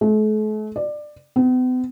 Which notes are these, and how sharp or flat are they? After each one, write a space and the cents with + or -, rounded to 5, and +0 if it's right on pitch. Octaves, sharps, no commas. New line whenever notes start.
A3 -45
D5 +20
B3 +45